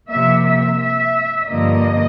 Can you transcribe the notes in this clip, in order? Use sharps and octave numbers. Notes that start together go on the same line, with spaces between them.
C3 F3 A#3 E5
E5
E5
G2 D3 F3 A#3 D#5